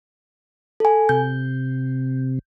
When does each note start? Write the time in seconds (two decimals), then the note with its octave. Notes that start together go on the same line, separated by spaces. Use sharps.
0.80 A4 G#5
1.09 C3 G6